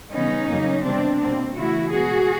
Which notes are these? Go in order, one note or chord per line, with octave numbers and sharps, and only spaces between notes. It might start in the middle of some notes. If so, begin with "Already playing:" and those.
C#3 E3 G3 B3 C#4 D#4
F2 C#3 F#3 A#3
C3 D#3 G3 B3 C4 D4
B2 G3 A#3 C4
C#3 E3 A3 E4 F#4
B2 G#3 B3 F#4 G#4